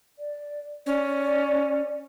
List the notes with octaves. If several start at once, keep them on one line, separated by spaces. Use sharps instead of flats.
D5
C#4 D5